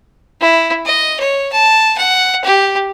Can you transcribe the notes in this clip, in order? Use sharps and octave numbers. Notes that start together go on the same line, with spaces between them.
E4
D#5
C#5
A5
F#5
G4